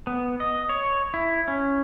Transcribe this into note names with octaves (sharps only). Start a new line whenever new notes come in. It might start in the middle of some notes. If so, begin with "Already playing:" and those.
B3
D#5
C#5
E4
C#4